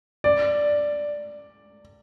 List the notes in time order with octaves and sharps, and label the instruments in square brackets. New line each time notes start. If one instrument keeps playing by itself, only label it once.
[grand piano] D5